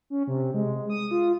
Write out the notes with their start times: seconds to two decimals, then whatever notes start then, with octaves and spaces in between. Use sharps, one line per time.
0.10 C#4
0.27 C3
0.54 G#3
0.90 D#6
1.11 F4